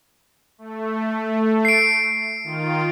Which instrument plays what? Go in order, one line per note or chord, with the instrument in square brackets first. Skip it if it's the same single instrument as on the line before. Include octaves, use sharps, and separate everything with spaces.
[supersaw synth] A3
[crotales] C7 D7
[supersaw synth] D#3 F4